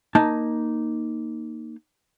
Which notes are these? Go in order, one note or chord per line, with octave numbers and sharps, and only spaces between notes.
A#3 D#4 A5